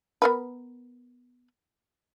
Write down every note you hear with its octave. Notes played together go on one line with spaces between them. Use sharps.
B3 A#4 B4